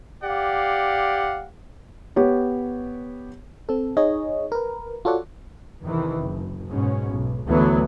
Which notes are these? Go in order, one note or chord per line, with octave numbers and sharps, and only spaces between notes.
G4 D5 F5 F#5
B3 G4 C#5
C4 A4
D#4 G#4 C#5 D#5
A#4 B4
F4 F#4 A4 C#5 D5 F#5
E2 C3 D#3 E3
F#1
G#2 B2 C#4
B1
D2 E3 F#3 A3 B3